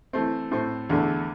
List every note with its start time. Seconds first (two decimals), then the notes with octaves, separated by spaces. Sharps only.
0.13 E3 A3 C4
0.51 A2 A3 C4
0.89 E2 D3 A3